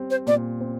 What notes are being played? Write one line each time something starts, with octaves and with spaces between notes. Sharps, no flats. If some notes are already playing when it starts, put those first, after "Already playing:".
Already playing: G3 C4
C5
A#2 D5
C4